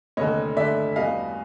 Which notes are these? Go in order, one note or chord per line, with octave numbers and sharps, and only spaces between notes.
F1 D#2 D3 C#5 D#5
F1 D#2 D3 D5 E5
E2 B2 G3 D#5 F5